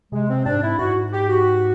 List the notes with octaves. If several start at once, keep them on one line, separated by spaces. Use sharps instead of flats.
C3 G#3
C4
G#2 D4
E4
G#2 F#4
G4
F#4